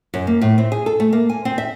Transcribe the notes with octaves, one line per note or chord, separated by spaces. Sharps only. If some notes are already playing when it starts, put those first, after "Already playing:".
F#2
A#3
A2
C4
G#4
A4
A3
A#3
G#5
C4
E5